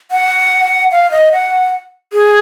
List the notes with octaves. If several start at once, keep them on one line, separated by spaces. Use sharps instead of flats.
F#5
F5
D#5
F#5
G#4